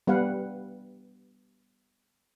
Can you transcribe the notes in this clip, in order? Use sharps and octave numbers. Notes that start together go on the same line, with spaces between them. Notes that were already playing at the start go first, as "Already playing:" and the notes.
G3 B3 B4 F5 F#5